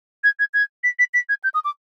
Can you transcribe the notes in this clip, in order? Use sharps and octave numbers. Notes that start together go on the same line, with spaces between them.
G#6
G#6
G#6
B6
B6
B6
G#6
G6
D#6
D6